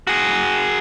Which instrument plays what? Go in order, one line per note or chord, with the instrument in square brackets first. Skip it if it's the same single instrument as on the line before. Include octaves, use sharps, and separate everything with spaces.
[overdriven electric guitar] F#4 G#4